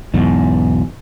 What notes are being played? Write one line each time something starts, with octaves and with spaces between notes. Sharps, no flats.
B1 E2 G#2